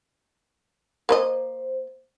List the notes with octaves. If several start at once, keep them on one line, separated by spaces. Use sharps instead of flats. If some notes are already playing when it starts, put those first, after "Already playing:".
A#3 B4 C5 D#5